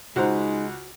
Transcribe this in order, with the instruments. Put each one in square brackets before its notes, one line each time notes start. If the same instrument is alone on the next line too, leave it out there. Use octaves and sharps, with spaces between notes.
[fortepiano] C#2 F#5 [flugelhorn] G#3 [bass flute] D#4 [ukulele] F#4 C5 A#5